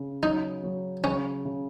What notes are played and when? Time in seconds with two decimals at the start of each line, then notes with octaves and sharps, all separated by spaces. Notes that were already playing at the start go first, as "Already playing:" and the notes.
Already playing: C#3
0.23 F#3 D#4
0.63 F#3
1.04 C#3 C#4
1.45 C#3